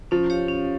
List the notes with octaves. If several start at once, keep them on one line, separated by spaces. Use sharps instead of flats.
F3 C#4
G4 C#5 F5
C#4